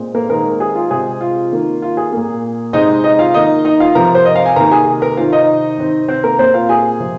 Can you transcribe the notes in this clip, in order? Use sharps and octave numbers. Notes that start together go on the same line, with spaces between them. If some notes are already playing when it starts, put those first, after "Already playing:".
Already playing: A#2 G#3 C4
A#3 A#4
D#3 G#3 A#3 C4 A#4
G#4
F4
C3 G#3 C4 G#4
F4
D#3 A#3
F4
G#4
A#2 A#3
C3 G#3 C4 D#4 D#5
D#4 D#5
F4 F5
D#3 A#3 D#4 D#5
D#4 D#5
F4 F5
C3 F3 C4 A#4 A#5
C5
D#5
F5
G#5
C3 D#3 A#3 A#4 A#5
G#4 G#5
A#4 A#5
C3 D#3 C4 F4 F5
D#4 D#5
C3 D#3 C4
C4 C5
A#3 A#4
A#2 A#3 C4 C5
F4 F5
G#4 G#5
C3 F3 G#3 C4